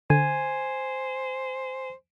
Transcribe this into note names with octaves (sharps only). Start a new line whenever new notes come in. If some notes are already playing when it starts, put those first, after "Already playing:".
D3 C5 G#5